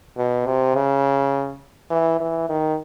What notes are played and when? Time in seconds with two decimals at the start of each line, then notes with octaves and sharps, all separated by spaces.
0.17 B2
0.46 C3
0.75 C#3
1.90 E3
2.20 E3
2.49 D#3